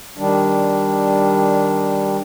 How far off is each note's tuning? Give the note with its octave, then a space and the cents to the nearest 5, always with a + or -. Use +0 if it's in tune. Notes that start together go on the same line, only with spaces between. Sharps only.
D#3 +0 G3 +0 D4 -5